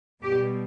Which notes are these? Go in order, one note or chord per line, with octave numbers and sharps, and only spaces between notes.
B2 G3 G4